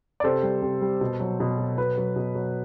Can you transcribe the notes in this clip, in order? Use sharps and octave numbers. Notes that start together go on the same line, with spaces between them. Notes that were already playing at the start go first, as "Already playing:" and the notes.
D5
C3 A4 C5
G3
C3
G3
B2
F#3
B2
F#3
B2 B4
F#3
B2
F#3